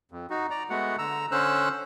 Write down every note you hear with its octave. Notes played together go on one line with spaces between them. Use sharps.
F2
D#4 F#4
D5 A#5
G#3 A3 B3 F#4 F#5
D3 A#5 E6
D3 C#4 C5 E6 F#6